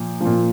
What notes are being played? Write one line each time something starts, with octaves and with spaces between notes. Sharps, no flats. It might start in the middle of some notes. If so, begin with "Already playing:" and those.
Already playing: A#2 F3
A#2 F3